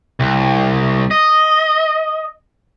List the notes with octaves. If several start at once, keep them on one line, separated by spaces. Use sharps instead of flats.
C2
D#5